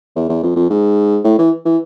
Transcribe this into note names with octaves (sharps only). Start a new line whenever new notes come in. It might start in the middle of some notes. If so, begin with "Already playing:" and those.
E2
E2
F2
F2
G#2
A2
E3
E3